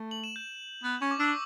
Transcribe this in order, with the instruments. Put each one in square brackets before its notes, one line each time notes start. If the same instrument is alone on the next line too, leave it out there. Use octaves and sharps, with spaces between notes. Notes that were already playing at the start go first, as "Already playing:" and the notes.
Already playing: [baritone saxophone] A3
[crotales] F#7
E7
G6
[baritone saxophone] B3
[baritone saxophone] C#4 [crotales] C#6
[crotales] D6
[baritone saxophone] D4 [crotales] E6
[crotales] D6